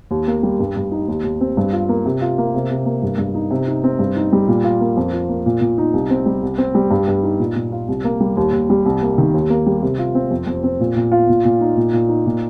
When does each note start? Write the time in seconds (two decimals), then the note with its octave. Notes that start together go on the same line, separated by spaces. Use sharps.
0.11 D#2
0.27 A#3
0.43 G3
0.59 G2
0.76 G2
0.91 D#4
1.08 D#2
1.24 D#2
1.41 C4
1.57 G2
1.72 F4
1.89 A#3
2.05 C3
2.21 F4
2.38 A#3
2.55 C3
2.71 C3
2.86 A#3
3.02 G2
3.18 G2
3.34 D#4
3.50 C3
3.67 D#4
3.84 C4
3.99 G2
4.16 D#4
4.32 G3
4.48 A#2
4.64 F4
4.81 A#3
4.97 F2
5.13 F4
5.29 A#3
5.46 A#2
5.61 A#2
5.78 D#4
5.93 C2
6.10 C4
6.26 G3
6.42 C2
6.58 C4
6.75 G3
6.91 G2
7.08 G2
7.23 D#4
7.39 A#2
7.56 A#2
7.72 F4
7.88 C2
8.04 A#3
8.20 G3
8.37 D#2
8.53 D#2
8.70 G3
8.85 C2
9.02 A#3
9.18 D#3
9.34 D#2
9.50 A#3
9.66 G3
9.82 C3
9.98 F4
10.15 C4
10.31 F2
10.47 F2
10.63 C4
10.80 A#2
10.96 A#2
11.12 F4
11.29 A#2
11.45 A#2
11.60 D#4
11.77 A#2
11.93 A#2
12.09 D#4
12.26 A#2